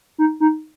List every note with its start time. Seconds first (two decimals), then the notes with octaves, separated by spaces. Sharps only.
0.18 D#4
0.40 D#4